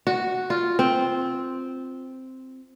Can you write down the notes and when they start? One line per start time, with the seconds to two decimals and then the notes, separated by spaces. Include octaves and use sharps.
0.07 F#4
0.50 F4
0.79 C4